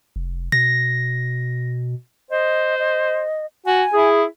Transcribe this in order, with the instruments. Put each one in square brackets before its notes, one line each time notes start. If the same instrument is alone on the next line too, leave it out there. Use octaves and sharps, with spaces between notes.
[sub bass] F1
[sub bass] B2 [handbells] A#6
[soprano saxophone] C5 [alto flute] D#5
[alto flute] D#5
[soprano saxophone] F#4 [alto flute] G#5
[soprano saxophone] E4 [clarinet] G#4